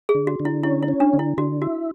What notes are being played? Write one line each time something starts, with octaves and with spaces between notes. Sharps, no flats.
G#4
D3
F#4
D3
E4
C#4 E4
E4
C#4
D4
D3
E4
D3 F#4
E4 F#4